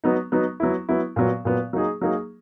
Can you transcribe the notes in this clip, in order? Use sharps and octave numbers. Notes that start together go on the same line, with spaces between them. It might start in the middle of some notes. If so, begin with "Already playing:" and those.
F#3 B3 D#4
F#3 B3 D#4
F#3 B3 E4
F#3 B3 E4
A#2 F#3 B3
A#2 F#3 B3
F#3 A#3 D#4 G#4
F#3 A#3 D#4 G#4